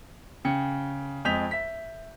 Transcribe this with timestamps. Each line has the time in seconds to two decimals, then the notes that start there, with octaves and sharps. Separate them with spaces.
0.45 C#3 G5 C#7
1.25 F2 G#3 D#6 G6 B6 F7
1.51 E5 B6